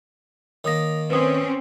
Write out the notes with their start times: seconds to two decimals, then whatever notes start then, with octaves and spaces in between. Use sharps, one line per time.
0.64 D#3 A#3 C#5 D#6 A#6
1.10 C4 C#4 B4 C5 D#6